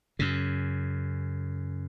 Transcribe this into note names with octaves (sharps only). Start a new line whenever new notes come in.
F#2 C#3